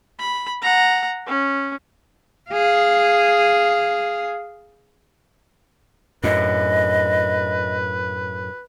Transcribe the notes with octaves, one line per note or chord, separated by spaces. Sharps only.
B5
F#5 A#5
C#4
G#4 F5
F#2 A2 B4 D#5